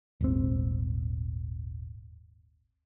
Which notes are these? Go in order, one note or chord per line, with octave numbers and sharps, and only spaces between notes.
D#1 G#1 C4